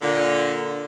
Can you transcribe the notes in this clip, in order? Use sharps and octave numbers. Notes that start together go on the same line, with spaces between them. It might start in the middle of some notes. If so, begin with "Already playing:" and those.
A#2 D3